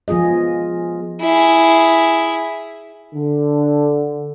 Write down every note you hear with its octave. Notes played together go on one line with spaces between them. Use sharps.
F3 B3 F4 G#4 D#5
E4 G#4
D3